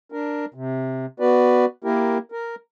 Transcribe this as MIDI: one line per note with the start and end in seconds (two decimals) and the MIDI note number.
0.12 0.45 62
0.12 0.45 70
0.54 1.06 48
1.20 1.65 59
1.20 1.65 66
1.20 1.65 71
1.20 1.65 74
1.84 2.18 58
1.84 2.18 64
1.84 2.18 67
1.84 2.18 70
2.32 2.55 70